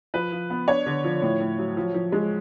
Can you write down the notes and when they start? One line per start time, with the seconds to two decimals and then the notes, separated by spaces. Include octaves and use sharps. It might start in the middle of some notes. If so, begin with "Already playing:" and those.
0.14 F3 B4
0.32 F3
0.50 B3
0.68 D4 C#5
0.86 D3
1.04 F3
1.22 A2
1.40 A2
1.58 F#3
1.77 F3
1.94 F3
2.12 G#3